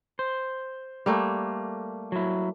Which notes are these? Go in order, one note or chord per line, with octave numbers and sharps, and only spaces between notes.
C5
G3 A3 A#3
F#3 E4